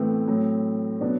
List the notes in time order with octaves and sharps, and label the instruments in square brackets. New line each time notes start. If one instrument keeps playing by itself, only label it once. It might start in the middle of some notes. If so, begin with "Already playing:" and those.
Already playing: [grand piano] A2 E3 A3 B3 C4
A2 F#3
B2 F#3 B3 D4